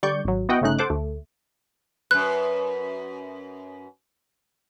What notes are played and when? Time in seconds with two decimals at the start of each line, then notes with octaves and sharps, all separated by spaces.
0.03 D3 G3 D5 C#6 G6
0.25 G#1 F#3
0.49 B3 E4 F#4 D#5 F#5 G5
0.61 G1 C#3 A3 C#4 D#4 F#6
0.79 A4 C5 F#5 D6
0.90 D2 A3
2.11 F#2 B4 F#6